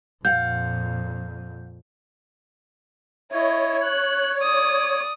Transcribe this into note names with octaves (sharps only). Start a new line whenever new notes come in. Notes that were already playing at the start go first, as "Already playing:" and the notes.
F2 A#2 F5 F#5 G6
E4 C#5 D#5
F#6
D5 D#6